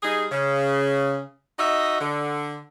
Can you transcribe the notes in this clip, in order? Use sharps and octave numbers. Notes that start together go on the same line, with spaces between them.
G3 D#4 G#4
C#3
D#4 F#4 D#5 E5
D3